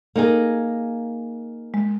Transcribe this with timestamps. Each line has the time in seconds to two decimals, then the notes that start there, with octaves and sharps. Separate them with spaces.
0.16 A#3 D#4 G#4
1.74 G#3